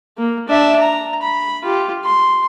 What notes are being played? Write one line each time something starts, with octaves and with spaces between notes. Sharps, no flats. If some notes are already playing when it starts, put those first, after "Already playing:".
A#3
D4 E5
A#5
B5
F4 G4
C6